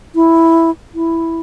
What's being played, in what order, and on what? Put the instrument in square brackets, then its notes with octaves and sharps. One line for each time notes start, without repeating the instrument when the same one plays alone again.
[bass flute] E4
E4